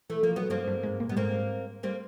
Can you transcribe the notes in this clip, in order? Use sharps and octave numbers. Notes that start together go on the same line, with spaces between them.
E3 A3
F3 A#3
F#3 B3
G2 G3 A#3 C4
G2 G3
G#2 G#3
A#2 A#3
G3 B3
G#2 G#3 A#3 C4
G3 A#3 C4